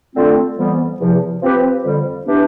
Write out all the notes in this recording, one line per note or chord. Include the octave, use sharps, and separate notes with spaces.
D3 A3 C4 F4
F2 E3 G3 B3
E2 C3 F3
F3 C4 G4 B4
F2 D3 G3
E3 B3 D4 G4 B4